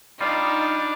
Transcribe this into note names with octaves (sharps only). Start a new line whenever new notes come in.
G3 D4 D#4 F4